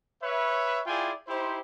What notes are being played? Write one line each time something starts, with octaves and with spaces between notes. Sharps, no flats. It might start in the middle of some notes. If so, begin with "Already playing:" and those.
B4 C#5 E5
E4 F4 G#4 D5 G5 G#5
D#4 E4 G4 C5